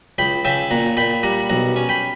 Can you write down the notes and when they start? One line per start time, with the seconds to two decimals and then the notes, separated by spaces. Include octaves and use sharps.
0.18 C#2 G5 B5
0.45 C#3 E5 G5
0.71 A#2 F#5 A#5
0.97 A#2 G5 B5
1.23 G3 F#5 A#5
1.50 B1 F#5 A#5
1.76 C#4
1.89 G5 B5